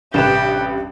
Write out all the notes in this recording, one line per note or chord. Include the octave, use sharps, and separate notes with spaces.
A1 G2 C3 G4 B4 E7